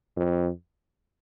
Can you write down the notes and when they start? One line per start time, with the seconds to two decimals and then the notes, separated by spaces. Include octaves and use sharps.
0.17 F2